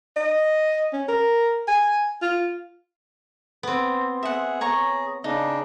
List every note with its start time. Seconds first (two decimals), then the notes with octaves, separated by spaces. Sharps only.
0.16 D#5
0.93 C#4
1.08 A#4
1.68 G#5
2.22 F4
3.63 B3 C4
4.23 G#4 E5 F#5
4.61 C#5 A#5 C#6
5.24 C#3 D4 D#4